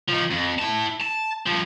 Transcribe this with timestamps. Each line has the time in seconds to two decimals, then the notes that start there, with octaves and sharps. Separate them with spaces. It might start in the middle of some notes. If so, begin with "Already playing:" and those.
0.08 F3 D#4
0.31 F2
0.59 E4 A5
1.00 A5
1.46 G2 F3